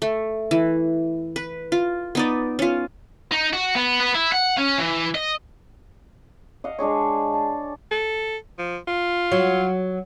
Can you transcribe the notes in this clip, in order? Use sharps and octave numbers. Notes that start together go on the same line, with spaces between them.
A3
E3
B4
F4
B3 D#4 D5
C#4 F4
D#4
F#4
B3
B3
E4
F#5
C#4
E3
D#5
D#5 F5 F#5
G#3 D4 G#4 C#5
A5
A4
F3
F4
F#3